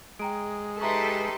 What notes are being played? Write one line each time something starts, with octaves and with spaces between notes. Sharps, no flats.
G#3 G5 A#5 D7
D#4 G4 A4 B4 E5 A#5 C6 C#6